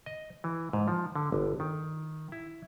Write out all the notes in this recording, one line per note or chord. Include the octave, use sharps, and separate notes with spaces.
D#5
E3
G#2
F3
D3
G1
D#3
E4